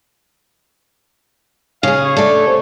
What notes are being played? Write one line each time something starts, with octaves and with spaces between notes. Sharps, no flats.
C#3 G#4 F5
C#5
A3 D4 A4
C3